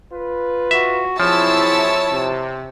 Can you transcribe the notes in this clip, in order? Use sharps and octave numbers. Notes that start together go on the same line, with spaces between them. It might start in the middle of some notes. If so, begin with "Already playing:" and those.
F4 B4
F#4 E5
F3 F#3 C4 E4 G#4 C#5 A5 E6
C3